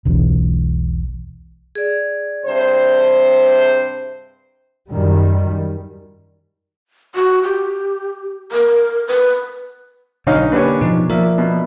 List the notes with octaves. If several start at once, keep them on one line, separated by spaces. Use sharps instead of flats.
E1 B1 E2
G#4 D5
G2 C3 C5
F#2 D#3 G3
F#4
G4
A#4
B4
B1 D3 C#4 D#4 F5
A#3 C#4 D4 G4 B4
B2 F3 D#4
F3 A#3 A#4 D5 E5
B2